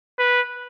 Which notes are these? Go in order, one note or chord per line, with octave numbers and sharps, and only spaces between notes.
B4